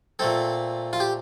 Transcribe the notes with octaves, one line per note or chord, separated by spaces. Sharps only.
A#2 A3 C4 A4
F4
G4